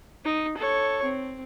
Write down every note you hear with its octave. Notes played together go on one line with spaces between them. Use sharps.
D#4
A4 C#5
C4